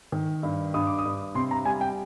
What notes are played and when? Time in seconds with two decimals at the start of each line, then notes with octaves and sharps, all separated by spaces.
0.12 D#3
0.43 G2
0.74 G2 D#6
0.87 D6
0.99 D#6
1.05 G2
1.35 C3 C6
1.51 A#5
1.65 G3 G#5
1.81 G5